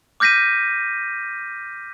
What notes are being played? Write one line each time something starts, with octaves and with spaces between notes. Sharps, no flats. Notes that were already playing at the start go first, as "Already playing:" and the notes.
D6 F6 G6 A#6 B6 D#7